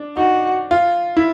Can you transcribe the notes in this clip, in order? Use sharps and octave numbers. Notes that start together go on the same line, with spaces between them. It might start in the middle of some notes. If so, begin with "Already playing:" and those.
Already playing: D4
D#4 F#4
F4
E4